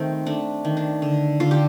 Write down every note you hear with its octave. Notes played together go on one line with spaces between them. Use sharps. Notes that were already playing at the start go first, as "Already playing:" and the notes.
Already playing: D#3 A3 C4
A3 D4
D#3
D4
D3
D3 F4
G4